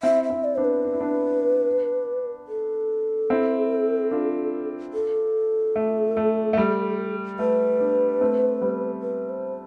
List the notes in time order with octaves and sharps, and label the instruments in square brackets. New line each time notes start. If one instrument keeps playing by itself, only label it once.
[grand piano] C4 E4 [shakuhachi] E5
[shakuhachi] E5
[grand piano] C4 E4
[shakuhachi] D5
[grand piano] B3 D4 [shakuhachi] C5
[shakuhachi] B4
[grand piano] D4
E4
B3 D4
[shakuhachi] A4
[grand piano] C4 E4
D4 F4
[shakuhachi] A4
[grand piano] A3
A3
A3
G3
[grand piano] A3 [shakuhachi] B4
[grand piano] B3 D4
A3 C4
G3 B3
[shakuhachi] B4
C5